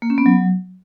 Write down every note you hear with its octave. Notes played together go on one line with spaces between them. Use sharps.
A#3
C#4
B3
F#3